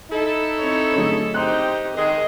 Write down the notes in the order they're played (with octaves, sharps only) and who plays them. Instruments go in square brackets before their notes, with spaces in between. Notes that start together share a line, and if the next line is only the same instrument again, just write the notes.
[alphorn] D#4 [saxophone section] E4 A4
[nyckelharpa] C4 C#5
[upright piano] D3 F#3 A3 [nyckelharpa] G#4
[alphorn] C4 [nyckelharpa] D#4 G4 [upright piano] C6 F#6
[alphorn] D#3 [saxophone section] G#3 G#4 [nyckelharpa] D#5